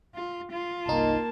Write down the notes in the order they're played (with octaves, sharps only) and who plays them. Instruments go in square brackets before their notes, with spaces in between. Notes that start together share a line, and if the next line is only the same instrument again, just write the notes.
[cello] F4
F4
[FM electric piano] G1 C2 D#4 [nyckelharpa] A#3 A5